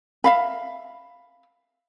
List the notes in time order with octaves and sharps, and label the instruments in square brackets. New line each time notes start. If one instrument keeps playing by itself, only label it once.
[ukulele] E5 F5 B5